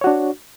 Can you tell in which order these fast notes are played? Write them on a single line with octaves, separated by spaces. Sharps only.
C#5 F#4 D4